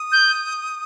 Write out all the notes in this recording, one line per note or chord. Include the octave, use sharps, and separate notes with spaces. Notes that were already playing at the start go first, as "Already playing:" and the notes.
Already playing: D#6
G6